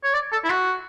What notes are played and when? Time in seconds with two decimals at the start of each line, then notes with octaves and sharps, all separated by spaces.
0.04 C#5
0.13 D5
0.32 A4
0.44 E4
0.50 F#4